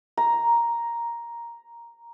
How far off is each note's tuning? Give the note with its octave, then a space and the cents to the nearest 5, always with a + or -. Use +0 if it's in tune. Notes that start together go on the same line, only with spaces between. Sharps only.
A#5 +5